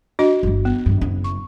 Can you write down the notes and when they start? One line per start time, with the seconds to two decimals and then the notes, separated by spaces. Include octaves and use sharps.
0.19 D4 F#4 D#5
0.43 G1 E3
0.65 B3
0.86 G2 D#3
1.01 F#1 E4
1.24 C#6